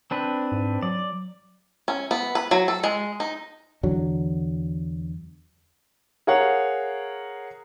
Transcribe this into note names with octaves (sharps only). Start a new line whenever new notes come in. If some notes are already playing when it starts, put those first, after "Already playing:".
C4 D4 B4
G#2
F#3 D5
C#4
B3
B4
F#3
A4
G#3
D#4
E2 D3 F#3
G#4 A#4 C#5 F5 F#5